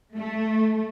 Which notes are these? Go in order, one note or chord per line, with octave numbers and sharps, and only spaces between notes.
A3